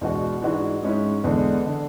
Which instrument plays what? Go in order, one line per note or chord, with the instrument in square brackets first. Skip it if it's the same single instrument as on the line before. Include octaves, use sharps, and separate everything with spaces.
[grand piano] E2 B2 G#3 D4 F#4
G#2 E3 G#3 D4 F#4
G#2 G#3 C#4 E4
E2 D3 G#3 B3
D3